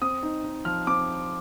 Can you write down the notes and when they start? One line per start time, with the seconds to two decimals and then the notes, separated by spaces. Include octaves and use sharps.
0.02 C4 D#6
0.23 D#4
0.44 D#4
0.65 F3 F6
0.87 C4 D6